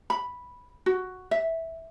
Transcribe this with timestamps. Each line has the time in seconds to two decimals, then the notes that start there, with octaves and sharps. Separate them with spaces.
0.10 B5
0.86 F#4
1.31 E5